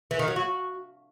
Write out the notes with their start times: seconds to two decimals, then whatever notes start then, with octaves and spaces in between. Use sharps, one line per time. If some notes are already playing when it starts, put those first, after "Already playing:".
0.11 E3
0.19 D#3
0.28 F#3
0.36 F#4